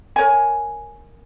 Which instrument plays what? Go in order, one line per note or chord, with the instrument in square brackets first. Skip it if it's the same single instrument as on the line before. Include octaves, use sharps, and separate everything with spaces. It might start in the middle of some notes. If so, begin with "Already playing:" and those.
[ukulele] A#4 C#5 G#5